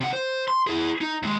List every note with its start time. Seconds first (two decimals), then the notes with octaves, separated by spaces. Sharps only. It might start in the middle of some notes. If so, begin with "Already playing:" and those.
0.01 C3 F#5
0.13 C5
0.48 C6
0.67 E4 G#4
1.01 D#4
1.23 D#2 G#3